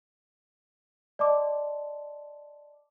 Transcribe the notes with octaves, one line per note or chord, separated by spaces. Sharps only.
D5 D#5 A5 C6 D6